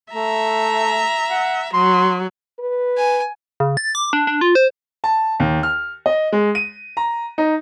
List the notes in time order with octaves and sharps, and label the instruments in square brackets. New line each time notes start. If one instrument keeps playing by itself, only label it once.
[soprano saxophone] A3 [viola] E5 A#5
[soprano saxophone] F#5
[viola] F#3 [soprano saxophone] C6
[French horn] B4
[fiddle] G#5
[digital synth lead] C#3
A6
D6
D4
D4
F4
C5
[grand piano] A5
D#2
F6
D#5
G#3
D#7
A#5
D#4